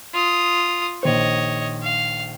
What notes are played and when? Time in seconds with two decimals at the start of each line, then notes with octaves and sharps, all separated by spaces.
0.14 F4 D#6
1.03 A#1 D#3 C5 C#5 D#5
1.83 F5